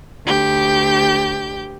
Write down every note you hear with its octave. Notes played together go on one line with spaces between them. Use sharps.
D2 G4 G6